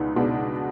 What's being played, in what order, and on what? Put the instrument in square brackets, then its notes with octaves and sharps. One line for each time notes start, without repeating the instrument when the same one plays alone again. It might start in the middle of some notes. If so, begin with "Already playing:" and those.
Already playing: [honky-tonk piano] C#2 B2 B3 D4 [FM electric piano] D#4
[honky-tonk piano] B2 G#3 B3 D4